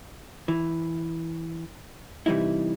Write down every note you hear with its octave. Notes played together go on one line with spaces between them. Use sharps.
E3
C3 E3 G3 D#4 E4